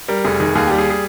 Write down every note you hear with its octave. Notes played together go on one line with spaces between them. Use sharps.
G3 A#4
F1 G#4
D#3 G#4
D#2 G#4
G3 G4
G#4
G#4